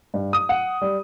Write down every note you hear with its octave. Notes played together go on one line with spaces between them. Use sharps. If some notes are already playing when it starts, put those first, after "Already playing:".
G2
D#6
F#5
G3